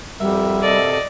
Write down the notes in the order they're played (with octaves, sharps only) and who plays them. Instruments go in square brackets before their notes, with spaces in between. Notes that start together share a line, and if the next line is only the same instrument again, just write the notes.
[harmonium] F2 [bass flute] G3 [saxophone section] F#4 A#4 E5
[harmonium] C3 A4 [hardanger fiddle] D5 D#5